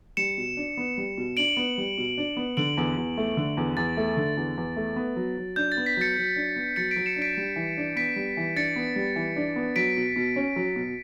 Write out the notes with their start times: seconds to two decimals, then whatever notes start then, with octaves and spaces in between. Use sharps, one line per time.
0.17 G3 C#7 E7
0.37 B2
0.57 D4
0.77 B3
0.98 G3
1.17 B2
1.37 D4 D7 F#7
1.57 B3
1.78 G3
1.98 B2
2.18 D4
2.36 B3
2.57 D3 D7 F#7
2.77 E2
2.97 E2
3.18 A3
3.37 D3
3.57 E2
3.77 E2 A6
3.97 A3
4.17 D3
4.37 E2
4.57 E2
4.76 A3
4.96 B3
5.16 F#3
5.37 F#3
5.56 D4 G6
5.72 A6
5.77 B3
5.86 B6
5.97 F#3 A6 C#7
6.17 F#3
6.36 D4
6.56 B3
6.76 F#3 A6 C#7
6.91 B6 D7
6.96 F#3
7.06 C#7 E7
7.16 D4
7.22 B6 D7
7.37 G3
7.56 E3
7.77 D4
7.96 B3 B6 D7
8.16 G3
8.37 E3
8.56 D4 A6 C#7
8.76 B3
8.96 G3
9.16 E3
9.36 D4
9.56 B3
9.76 F#3 B6 D7
9.97 B2
10.16 B2
10.36 C#4
10.56 F#3
10.76 B2